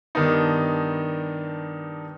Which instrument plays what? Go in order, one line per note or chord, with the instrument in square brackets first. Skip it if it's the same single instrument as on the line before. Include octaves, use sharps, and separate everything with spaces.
[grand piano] G2 D#3 B3 D4 D#4